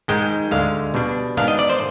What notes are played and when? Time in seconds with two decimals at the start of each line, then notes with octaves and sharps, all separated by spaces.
0.08 G#2 D#3 G#3 G5
0.51 D2 D3 G#3 F5
0.94 B2 G3 D4
1.37 G#2 D#3 B3 D4 F5
1.48 D#5
1.59 D5
1.70 C5